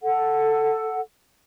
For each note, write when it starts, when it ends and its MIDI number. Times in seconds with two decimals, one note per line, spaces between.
0.01 1.00 69
0.01 1.00 78